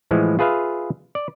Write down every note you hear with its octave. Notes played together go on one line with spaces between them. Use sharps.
A2 E3 F3 G#3
F4 G#4 B4 E5 F5
D5